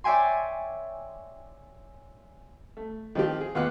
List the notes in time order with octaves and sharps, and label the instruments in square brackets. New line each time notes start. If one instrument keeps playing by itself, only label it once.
[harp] C#5 D5 E5 G5 G#5 C6
[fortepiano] A3
D#3 F3 C4 G4
G#4
D#2 B3 F4 F#5 D6 F#6